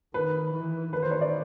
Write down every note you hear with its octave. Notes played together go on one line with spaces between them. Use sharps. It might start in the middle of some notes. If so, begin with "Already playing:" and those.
D#3 B4
E3
D#3 B4
C5
C#5
D5